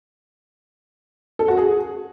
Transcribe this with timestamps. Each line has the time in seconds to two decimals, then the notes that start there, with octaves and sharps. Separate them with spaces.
1.39 A4
1.48 F#4
1.57 G#4